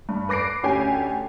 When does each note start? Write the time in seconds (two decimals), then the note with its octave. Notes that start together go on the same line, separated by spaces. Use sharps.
0.09 G2
0.29 B4 D6 A#6 C7 D7
0.63 D2 C#4 G4 G#5